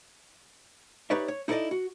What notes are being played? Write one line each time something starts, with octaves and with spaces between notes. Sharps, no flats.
D#4 G4 B4 C#5 D5 E5
C#5
D#4 E4 A4 A#4 D5 D#5
F#4